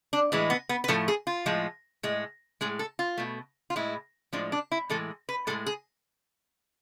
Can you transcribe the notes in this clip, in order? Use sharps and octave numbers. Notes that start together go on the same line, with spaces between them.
D4
A2 E3 G#3
B3
B3
B4
A2 F3 A3 A4
G#4
F4
A2 F3 G#3
A2 G#3
A2 G#3 G#4
A4
F4
B2 A3
F4
A2 G#3 E4
A2 F3 G#3 D4
D4
E4
A2 E3 G#3 A4
B4
A2 G#3 A4
G#4